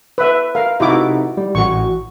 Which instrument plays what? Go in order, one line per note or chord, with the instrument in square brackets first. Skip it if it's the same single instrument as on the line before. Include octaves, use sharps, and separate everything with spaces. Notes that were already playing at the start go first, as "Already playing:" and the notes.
[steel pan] B4 E5
A#4 F5
[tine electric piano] C3 D#4 [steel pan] E4 F#4 D6
[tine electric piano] G3
[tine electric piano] A1 F#4 [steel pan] C#6